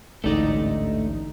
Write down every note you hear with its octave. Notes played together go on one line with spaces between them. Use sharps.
A1 D2 G#2 D3 A3 D#4 D5